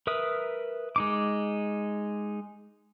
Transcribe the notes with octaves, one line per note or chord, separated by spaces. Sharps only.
A#4 B4 E5 D#6
G#3 D#4 D6